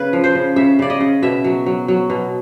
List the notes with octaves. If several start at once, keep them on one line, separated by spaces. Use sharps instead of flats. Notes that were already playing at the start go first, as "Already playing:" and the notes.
Already playing: C#3 B4
F3
C5
C#3
C#3 E5
C#3 D5
D#5
C#3
B2 E5
F#3
F#3
F#3
B2